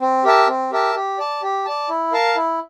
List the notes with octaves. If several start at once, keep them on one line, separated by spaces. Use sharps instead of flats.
C4
G4 A#4 E5 A5
C4
G4 A#4 E5 A5
G4
D5 A5
G4
D5 A5
E4
A#4 F5 A5
E4